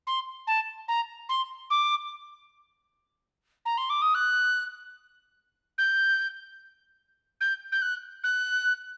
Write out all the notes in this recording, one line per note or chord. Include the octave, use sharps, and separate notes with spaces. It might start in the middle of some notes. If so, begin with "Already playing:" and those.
C6
A5
A#5
C6
D6
A#5
C6
D6
D#6
F#6
G6
G6
G6
F#6
F#6